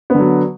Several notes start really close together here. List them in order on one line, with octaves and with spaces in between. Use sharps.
B3 D3 F#3